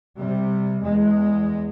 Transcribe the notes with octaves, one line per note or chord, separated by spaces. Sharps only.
C3 G3
E2 G#3